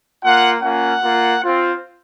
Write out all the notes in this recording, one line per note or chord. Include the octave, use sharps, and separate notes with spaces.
A#3 F4 F#5
A#3 C#4 F4 F#5
A#3 F4
C4 F4